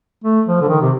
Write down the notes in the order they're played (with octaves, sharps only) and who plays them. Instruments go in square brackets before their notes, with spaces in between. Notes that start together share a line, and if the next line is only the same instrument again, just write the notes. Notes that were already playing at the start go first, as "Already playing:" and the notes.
[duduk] A3
F3
D3
D#3
C3